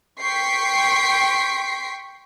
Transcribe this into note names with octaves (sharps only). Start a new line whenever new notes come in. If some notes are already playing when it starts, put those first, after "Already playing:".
G5 C6 C#6 B6 C7 D7